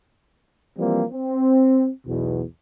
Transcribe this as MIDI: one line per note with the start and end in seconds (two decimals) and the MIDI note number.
0.78 1.03 52
0.78 1.03 53
0.78 1.03 55
0.78 1.03 58
0.78 1.03 60
1.11 1.90 60
2.07 2.43 35
2.07 2.43 40
2.07 2.43 47